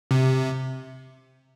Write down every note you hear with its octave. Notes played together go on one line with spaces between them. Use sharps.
C3